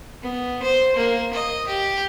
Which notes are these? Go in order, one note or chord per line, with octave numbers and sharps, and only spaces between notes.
B3
C5
A#3
D#5
G4